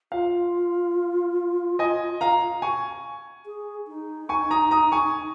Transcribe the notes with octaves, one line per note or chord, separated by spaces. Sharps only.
F4 F5
D#5 G#5
F5 A#5
G#5 C#6
G#4
D#4
G#5 C#6
A#5 D#6
A#5 D#6
G#5 C#6